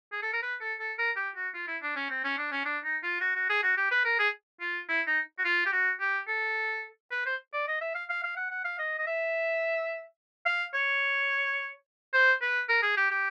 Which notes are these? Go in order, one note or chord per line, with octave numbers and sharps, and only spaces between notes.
G#4
A4
A#4
B4
A4
A4
A#4
G4
F#4
F4
E4
D4
C#4
C4
C#4
D4
C#4
D4
D#4
F4
F#4
F#4
G#4
F#4
G4
B4
A#4
G#4
F4
E4
D#4
F#4
F4
G4
F#4
G4
A4
B4
C5
D5
D#5
E5
F5
F5
F5
F#5
F#5
F5
D#5
D#5
E5
F5
C#5
C5
B4
A#4
G#4
G4
G4